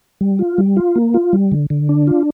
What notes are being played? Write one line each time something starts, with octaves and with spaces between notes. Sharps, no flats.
G3
F4
G3
F4
A#3
F4
G3
D3
D3
D4
F4